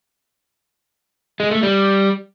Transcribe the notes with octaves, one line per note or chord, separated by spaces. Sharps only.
G#3
A3
G3